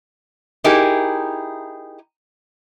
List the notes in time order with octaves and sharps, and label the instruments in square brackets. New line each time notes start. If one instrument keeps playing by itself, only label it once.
[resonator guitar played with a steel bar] D#4 E4 G4 G#4 A#4